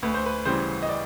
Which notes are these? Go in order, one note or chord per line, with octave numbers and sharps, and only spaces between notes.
D2 B4
C5
B4
C#3 E3 G3 C5
D#5
D5